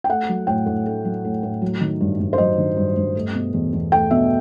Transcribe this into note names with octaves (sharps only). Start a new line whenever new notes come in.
G5
A3 F#5
F#3
A2 G5
A2
A3
F#3
A2
A2
F#3
D#3
G2
G2
C5
F#3 D#5
D#3
G2
G2
A3
B2
E2
E2
A3 G5
B2 E5